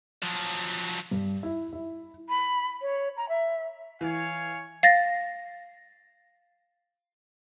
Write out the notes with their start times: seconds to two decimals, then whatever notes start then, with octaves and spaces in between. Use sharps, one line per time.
0.22 F3 F#3
1.11 G2
1.43 E4
1.73 E4
2.29 B5
2.82 C#5
3.17 A#5
3.29 E5
4.01 E3 C#5 F5 G#5
4.83 F5 A6 A#6